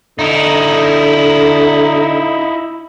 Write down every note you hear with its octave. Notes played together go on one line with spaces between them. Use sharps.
D3 D#4 E4